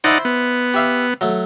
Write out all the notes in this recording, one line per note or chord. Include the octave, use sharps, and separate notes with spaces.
D#4 E4 C5 D5 F#5
B3
G4 E5 F5
F#3 A3